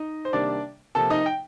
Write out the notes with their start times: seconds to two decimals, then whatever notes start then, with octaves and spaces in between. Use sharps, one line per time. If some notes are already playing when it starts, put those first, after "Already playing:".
Already playing: D#4 D#5
0.25 C5
0.33 C3 D#3 G3 A#3 D4 D5
0.95 C3 F3 A#3 A4 A5
1.10 D#4 D#5
1.26 G5